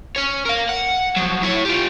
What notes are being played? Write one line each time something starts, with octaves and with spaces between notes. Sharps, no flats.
C#4 C#5
A#4 F5
F#5
F3 F#3
E4 C#5
F4 G4